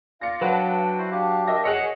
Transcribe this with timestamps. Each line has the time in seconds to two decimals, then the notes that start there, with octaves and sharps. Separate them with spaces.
0.21 F4 D5 F5 A#6 C#7
0.41 F#3 D4 B4 F#5 G5 A5
0.98 E4 F#4 C5
1.11 D4 G4 F5
1.47 A#4 D#5 E5 A#6
1.65 G#4 C#5 D#5 F#5